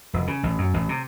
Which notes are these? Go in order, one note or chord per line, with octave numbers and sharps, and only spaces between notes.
F1
C#3
A1
F#2
A1
C3